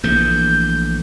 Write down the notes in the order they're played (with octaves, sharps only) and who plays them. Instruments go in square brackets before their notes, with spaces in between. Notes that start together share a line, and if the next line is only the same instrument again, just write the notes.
[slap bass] A#1 E3 A3 [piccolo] G6